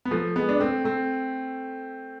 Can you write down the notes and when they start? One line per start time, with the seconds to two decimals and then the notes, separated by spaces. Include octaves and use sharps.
0.05 B3
0.11 F3 A3
0.36 G#3 B3
0.49 D4
0.60 A3 C4
0.84 A3 C4